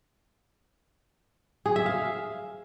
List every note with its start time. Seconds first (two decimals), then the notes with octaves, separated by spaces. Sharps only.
1.66 G#4
1.76 E5
1.86 F5